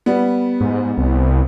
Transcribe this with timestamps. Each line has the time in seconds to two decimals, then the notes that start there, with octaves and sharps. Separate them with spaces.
0.06 G3 B3
0.61 G#2
0.98 C2